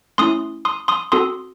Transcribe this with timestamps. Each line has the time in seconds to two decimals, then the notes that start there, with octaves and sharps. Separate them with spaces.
0.18 A3 C#4 E4 C6 D#6
0.65 C6 D#6
0.88 C6 D#6
1.12 C4 F#4 A4 C6 D#6